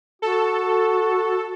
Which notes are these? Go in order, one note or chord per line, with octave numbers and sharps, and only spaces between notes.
F#4 A4